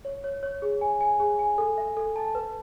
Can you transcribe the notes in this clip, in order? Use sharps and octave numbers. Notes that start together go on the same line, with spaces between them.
C#5
C#5
C#5
G#4
G#5
G#5
G#4
G#5
A4
E5
A4
A5
B4